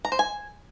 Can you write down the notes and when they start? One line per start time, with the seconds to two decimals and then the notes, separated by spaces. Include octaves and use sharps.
0.05 A#5
0.12 C5
0.19 G#5